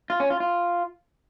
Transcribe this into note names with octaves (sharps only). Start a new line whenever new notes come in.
F4
C#4
F4
F4